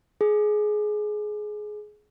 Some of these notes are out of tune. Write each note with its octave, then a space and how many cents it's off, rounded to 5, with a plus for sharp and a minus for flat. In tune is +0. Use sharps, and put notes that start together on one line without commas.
G#4 +20